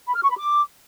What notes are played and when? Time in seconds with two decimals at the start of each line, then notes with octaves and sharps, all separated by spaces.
0.06 B5
0.14 F6
0.22 C#6
0.29 B5
0.37 D6